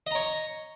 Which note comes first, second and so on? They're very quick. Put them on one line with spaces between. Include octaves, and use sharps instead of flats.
D#5 A#5 C#5